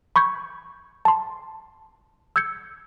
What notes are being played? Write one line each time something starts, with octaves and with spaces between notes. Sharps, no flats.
B5 C#6 G6 G#6
A5 C6
E6 G6 G#6 C#7